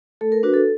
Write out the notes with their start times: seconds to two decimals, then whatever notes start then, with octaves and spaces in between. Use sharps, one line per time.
0.21 A3 A4
0.32 A#4
0.43 D4 F#4 B4
0.54 A4